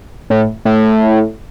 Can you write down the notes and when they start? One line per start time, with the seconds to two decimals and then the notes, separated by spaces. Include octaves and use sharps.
0.30 A2
0.65 A2